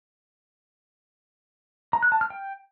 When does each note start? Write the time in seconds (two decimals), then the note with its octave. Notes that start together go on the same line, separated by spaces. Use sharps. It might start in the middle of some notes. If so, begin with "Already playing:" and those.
1.93 A#5
2.03 F#6
2.12 A5
2.21 F6
2.30 G5